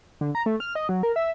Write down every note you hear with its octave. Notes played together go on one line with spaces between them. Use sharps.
D3
A#5
A3
F6
D#5
F#3
A#4
E5